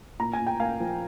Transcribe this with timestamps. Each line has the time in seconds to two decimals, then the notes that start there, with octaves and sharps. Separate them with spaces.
0.19 A#2 A#5
0.33 G#5
0.40 A#2
0.47 G5
0.59 A#3 F5 G#5
0.80 F3